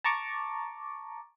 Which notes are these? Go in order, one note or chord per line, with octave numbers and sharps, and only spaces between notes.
A5 A#5 C#6 D6